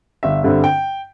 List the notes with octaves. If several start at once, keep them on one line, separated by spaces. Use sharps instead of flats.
G1 E5
G2 D3 C4
G5